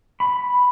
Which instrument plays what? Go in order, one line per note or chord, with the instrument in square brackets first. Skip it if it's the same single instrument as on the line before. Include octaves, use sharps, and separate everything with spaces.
[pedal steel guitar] B5